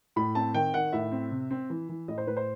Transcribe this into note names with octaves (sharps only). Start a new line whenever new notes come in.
A2 B5
C4 A5
D#3 G5
D#3 F#5
A2 E5
C4
C3
C4
E3
E3
A2 D#5
C5
A2 B4
C5